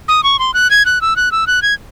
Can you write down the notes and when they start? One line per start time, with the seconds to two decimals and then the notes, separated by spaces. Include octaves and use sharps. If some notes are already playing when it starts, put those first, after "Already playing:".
0.08 D#6
0.23 C#6
0.39 C6
0.54 F#6
0.71 G#6
0.86 F#6
1.01 E6
1.16 F#6
1.32 E6
1.47 F#6
1.62 G#6